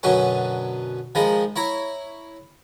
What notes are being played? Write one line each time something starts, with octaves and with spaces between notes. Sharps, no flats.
F#2 B2 D3 F#3 G#5 C#6
D#3 F3 G#3 A#5 B5
E4 C#5 A#5 B5